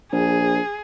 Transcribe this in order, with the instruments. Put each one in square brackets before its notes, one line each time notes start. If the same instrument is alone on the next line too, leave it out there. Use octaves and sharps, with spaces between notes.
[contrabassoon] A#1 [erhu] G#4